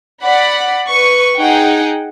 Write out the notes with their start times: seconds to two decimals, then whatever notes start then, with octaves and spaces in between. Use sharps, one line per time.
0.22 D5 F#5 B5
0.89 B4 C#6
1.39 D#4 G#4 F#5 G5